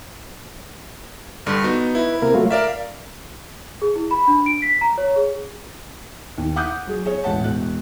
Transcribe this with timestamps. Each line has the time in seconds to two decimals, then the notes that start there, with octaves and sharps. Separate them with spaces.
1.47 G2 D3
1.64 B3 D#4 F#4
1.95 E4 B4
2.22 C3 A#3 A#4
2.34 F#3 A3 F4
2.51 A#4 D5 E5 F5
3.82 G#4
3.96 E4
4.11 B5
4.28 D4
4.46 D7
4.62 B6
4.81 A#5
4.98 C#5
5.16 G#4
6.38 D#2
6.56 F#5 D6 D#6 F#6 G6
6.87 F#3 G#4
7.06 G#4 C#5
7.24 E1 A1 F#5 A5
7.44 E1 F#6